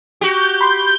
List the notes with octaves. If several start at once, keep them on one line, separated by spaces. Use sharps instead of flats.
F#4 G4 G6
B5 C6 G6